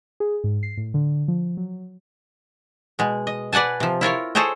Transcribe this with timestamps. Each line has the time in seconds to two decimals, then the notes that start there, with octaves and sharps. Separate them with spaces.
0.20 G#4
0.44 G#2
0.63 C7
0.77 A2
0.94 D3
1.28 F3
1.57 F#3
2.99 B2 G#3
3.27 D#5
3.52 B4 D5 F#5 G#5 A5
3.80 C3 F3
4.01 E4 F4 A#4 C#5
4.35 G#4 A4 C5 C#5 D#5 G5